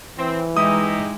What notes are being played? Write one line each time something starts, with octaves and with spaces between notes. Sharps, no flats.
E3 C4
G#3 D#4 E4 G4 D#6